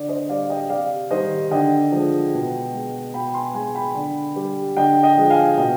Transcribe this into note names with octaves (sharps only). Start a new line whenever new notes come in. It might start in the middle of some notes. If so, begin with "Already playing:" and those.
Already playing: D3 D5
C5 D#5
G3 D5 F5
D#5 G5
C3 D5 F5
D#3 G3 C5 D#5
D3 D#5 G5
F3 G#3
B2
G#3
B2 G5 B5
B5
G#5 C6
G#3 G#5 C6
G5 B5
D3
G3
D3 D#5 G5
D#5 G5
F3 G#3
F5 G#5
B2 D#5 G5